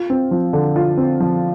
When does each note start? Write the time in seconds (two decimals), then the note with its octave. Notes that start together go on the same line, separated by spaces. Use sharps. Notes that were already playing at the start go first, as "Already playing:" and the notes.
Already playing: F4
0.10 C4
0.31 F3
0.53 D3
0.76 F4
0.97 C4
1.20 F3